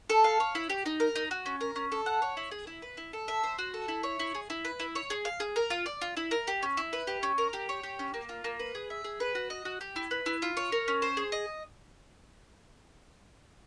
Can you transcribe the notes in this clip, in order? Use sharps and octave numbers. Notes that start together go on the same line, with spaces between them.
A4
F5
C#5
E4
G4
D#4
A#4
D#4
F#4
C#4
A#4
C#4
A4
F#5
C#5
E4
G#4
E4
B4
E4
A4
E5
C5
F#4
A4
E4
C#5
E4
G#4
E4
B4
E4
C#5
G#4
F5
G#4
A#4
F4
D5
F4
E4
A#4
G4
C#4
E4
B4
G4
C#4
A#4
G4
C#5
G4
C#4
A#3
F4
A#3
B4
G#4
E5
G#4
B4
F#4
D#5
F#4
G4
E4
B4
E4
F4
C#5
A#4
C#4
C5
G#4
D#5